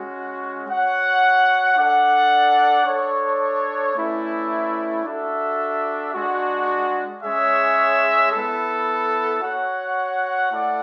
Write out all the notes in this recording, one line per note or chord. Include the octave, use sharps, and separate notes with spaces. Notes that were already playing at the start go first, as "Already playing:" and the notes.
Already playing: G#3 C#4 F#4
F#4 C#5 F#5
D4 A4 D5 F#5
D4 A4 C#5
A3 C#4 E4 B4 D5
D4 F#4 A4 E5
G#3 D4 F#4
G#3 C#4 G#4 C#5 E5
B3 E4 A4
F#4 C#5 F#5
A3 E4 A4 D5 F#5